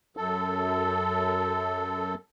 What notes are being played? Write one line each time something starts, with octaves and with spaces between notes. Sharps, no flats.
F#2 A4